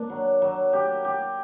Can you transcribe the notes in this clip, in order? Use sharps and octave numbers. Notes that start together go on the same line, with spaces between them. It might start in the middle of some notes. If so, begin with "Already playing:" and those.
Already playing: A#3 D4 A#4
F#3
F#3
G4
G4